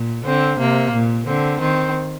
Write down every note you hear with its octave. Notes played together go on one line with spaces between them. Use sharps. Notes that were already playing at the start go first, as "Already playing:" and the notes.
Already playing: A#2
D3 C4
C3 A#3
A#2
D3 C4
D#3 C4